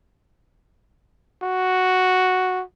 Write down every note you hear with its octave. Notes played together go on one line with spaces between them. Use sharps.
F#4